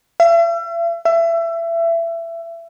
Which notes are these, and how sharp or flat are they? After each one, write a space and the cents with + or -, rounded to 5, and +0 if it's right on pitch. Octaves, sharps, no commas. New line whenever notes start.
E5 +40
E5 +25